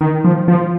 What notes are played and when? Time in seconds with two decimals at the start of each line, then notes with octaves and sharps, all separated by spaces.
0.01 D#3
0.25 F3
0.48 F3